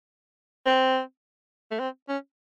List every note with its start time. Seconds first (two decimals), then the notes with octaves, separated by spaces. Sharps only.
0.67 C4
1.72 A3
1.80 C4
2.09 C#4